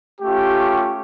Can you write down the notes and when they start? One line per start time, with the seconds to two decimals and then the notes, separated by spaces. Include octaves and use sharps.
0.21 A3 C#4 F4 G4